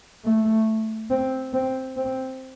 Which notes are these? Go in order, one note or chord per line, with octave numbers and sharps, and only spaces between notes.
A3
C4
C4
C4